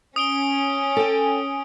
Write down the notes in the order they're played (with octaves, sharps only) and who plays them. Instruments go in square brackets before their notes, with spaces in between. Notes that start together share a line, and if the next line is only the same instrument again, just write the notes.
[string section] C#4 [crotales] D#6 D7 G7
[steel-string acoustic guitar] A4 G5